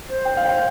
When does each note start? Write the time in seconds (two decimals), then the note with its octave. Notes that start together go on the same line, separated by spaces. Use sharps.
0.09 C5
0.25 G5
0.37 F5
0.48 G5